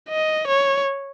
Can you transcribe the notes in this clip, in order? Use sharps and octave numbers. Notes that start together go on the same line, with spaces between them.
D#5
C#5